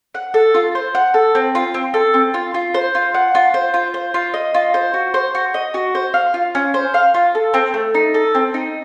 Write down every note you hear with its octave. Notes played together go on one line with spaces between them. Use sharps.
F#5
A4
F4
C5
F#5
A4
C4
F4
C4
A4
C4
F4
F4
C5
F4
F#5
F4
C5
F4
C5
F4
D#5
F4
C5
F#4
C5
F#4
D#5
F#4
C5
F5
F4
C#4
C5
F5
F4
A4
C4
A3
D#4
A4
C4
D#4